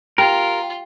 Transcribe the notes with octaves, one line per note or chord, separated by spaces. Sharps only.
F4 G4 A#4